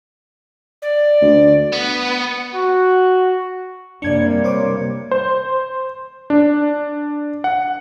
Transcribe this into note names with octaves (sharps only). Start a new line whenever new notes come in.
D5
D2
B3
F#4
F#2 C3 G3 A#3 D4 D5 G#6 C#7
C5 C#5 D6
C5
D4
F#5